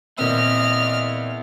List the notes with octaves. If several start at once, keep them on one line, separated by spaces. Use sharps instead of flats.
A#2 B3 C4 E4 D#5 F6